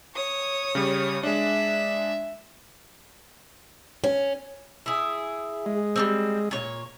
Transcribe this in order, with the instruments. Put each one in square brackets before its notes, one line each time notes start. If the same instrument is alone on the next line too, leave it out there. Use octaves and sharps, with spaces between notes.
[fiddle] C#5 D#6
[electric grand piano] C#3 G3
[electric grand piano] G#3 D4 [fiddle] E5
[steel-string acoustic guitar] C#4
[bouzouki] E4 G#4
[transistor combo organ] G#3
[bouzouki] G3 A#3 C4
A#2 C#5